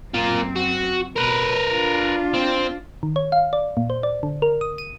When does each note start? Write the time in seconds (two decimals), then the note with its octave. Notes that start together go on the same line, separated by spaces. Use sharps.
0.14 F#2 A#3 C4 F4
0.56 F#4
1.16 B2 A#4 B4
1.67 D4 F4
2.34 C4
3.03 D#3
3.16 C#5
3.32 F5
3.53 D5
3.77 A#2
3.90 C5
4.03 D5
4.23 D3
4.42 A#4
4.61 D#6
4.78 D#7